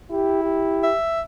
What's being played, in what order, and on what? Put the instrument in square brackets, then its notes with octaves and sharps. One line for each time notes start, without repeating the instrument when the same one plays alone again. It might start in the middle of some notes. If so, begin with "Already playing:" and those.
[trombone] E4 [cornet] G4
[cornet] G4
[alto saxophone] E5